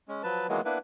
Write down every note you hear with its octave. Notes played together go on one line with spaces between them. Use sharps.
G#3 C#4
F3 F#3 B4 A5
D#3 E3 F#3 G#3 A#3 B3
A#3 B3 D4 E4 B4